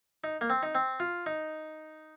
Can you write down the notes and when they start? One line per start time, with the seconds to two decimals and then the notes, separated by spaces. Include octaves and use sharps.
0.24 D#4
0.41 A#3
0.50 C4
0.63 D#4
0.75 C4
1.00 F4
1.26 D#4